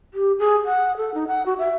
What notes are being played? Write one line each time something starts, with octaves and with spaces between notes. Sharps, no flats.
G4
G#4
F#5
A4
D#4
F#5
F#4
E5